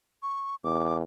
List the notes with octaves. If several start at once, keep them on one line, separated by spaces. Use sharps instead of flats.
C#6
E2 D6